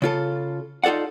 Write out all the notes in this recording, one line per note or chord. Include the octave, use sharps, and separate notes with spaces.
C#3 F4 A4
D#4 F4 A4 D5 F#5